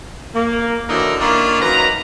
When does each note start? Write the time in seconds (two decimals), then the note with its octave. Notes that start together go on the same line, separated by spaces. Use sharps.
0.35 A#3
0.89 D3 E3 F#3 D4 D#4 A#4
1.21 D#3 A#3 C#4 D4 E4 F4
1.62 F#2 D#3 A#3 B4 A#5